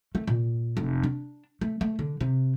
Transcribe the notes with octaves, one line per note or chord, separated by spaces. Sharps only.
A3
A#2
F1
D4
A3
A3
D3
C3